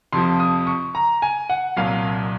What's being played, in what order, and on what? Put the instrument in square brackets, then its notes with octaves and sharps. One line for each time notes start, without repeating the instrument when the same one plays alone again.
[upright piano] F2 C3 F3 C6
D#6
C#6
A#5
G#5
F#5
C2 A#2 F#3 F5